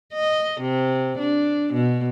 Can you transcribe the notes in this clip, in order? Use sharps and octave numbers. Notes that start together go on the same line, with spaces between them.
D#5
C3
D4
B2